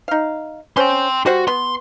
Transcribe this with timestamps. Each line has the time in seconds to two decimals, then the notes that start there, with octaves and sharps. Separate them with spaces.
0.08 D#4 F5
0.77 C#4 C5 G5 C6
1.26 G3 F#4 C5 F#5
1.48 B3 C6